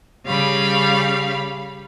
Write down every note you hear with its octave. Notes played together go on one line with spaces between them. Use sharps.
C#3 G3 F5 B5